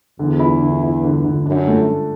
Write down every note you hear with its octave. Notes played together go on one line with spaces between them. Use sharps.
E2 D3
E4
D3
E4
D3
D3
F#2 D4
A3